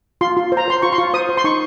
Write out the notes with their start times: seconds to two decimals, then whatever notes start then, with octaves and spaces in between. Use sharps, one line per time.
0.21 F4 C6
0.37 F4
0.52 C5
0.57 A#5
0.68 C5 C6
0.82 F4 C#6
0.93 C6
0.98 F4 C#6
1.14 C5 D#6
1.29 C5
1.37 C6
1.44 D#4 C#6